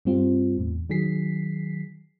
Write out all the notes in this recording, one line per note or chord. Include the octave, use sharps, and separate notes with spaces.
G2 G3 C4 F4
E2 A2
D#3 F#3 G#4 B6 C7